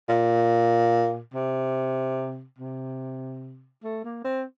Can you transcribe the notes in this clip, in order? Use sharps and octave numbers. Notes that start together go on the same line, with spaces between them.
A#2
C3
C3
A3
A#3
C4